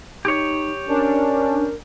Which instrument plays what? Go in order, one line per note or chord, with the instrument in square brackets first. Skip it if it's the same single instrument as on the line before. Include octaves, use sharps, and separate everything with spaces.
[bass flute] D#4 [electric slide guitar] G4 C#5
[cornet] C#4 [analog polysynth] D4 [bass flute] A#4